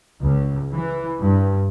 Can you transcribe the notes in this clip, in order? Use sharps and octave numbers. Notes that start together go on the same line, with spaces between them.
C#2
E3
G2